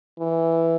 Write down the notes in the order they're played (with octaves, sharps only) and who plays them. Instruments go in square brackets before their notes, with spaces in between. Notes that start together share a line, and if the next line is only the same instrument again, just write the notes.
[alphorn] E3